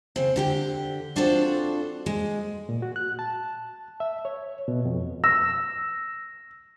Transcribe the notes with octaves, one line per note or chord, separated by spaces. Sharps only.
C#3 C4
D3 G4 G5
C4 D4 F4 F#4 A4 C5
G#3
A#2
F#4
F#6
A5
E5
C#5
B2
F2
E6 A#6